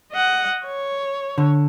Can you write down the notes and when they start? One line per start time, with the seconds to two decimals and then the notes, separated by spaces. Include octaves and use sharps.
0.12 D#5 F#5
0.66 C#5
1.38 D3